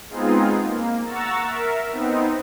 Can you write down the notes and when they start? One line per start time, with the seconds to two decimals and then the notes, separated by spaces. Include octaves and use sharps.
0.10 G#3 B3 C4 D#4 F4 G#4
0.63 A#3
1.05 F#5 A#5 C#6 E6 A6
1.41 A#4 E5
1.90 B3 C4 D#4